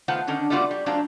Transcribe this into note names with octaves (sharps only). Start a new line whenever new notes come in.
D#3 A3 B3 F4 C5 F#5
D3 D#3 C#4 D4
G3 A3 B3 F4 F#4 D5
G3
F#3 A3 C4 D4 F4